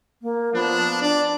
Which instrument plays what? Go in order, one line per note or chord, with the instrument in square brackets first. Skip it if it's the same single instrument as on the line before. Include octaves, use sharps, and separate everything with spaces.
[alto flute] A#3
[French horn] F3 [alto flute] B3 [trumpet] D4
[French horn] D4 [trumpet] D5